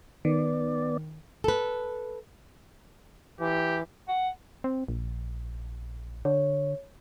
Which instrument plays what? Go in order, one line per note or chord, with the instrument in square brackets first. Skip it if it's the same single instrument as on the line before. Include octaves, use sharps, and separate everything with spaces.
[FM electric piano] D#3 [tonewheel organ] B3 D5
[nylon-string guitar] A4 B4
[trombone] E3 [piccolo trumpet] G4
[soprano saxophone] F#5
[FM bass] C4
A#1
[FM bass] D3 [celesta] C#5